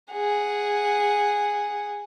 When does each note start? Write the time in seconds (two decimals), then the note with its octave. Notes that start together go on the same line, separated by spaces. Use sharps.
0.12 G#4 F#5